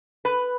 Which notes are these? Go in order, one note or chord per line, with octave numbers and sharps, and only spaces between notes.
B4